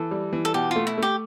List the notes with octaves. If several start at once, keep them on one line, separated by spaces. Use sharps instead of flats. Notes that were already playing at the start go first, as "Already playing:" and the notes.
Already playing: E3 A4
G3
E3
A4
B2 G4
A3 F4
E4
A3 G4